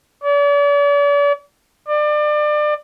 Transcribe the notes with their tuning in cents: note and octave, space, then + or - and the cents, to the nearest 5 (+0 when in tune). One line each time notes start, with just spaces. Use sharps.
D5 -45
D5 +30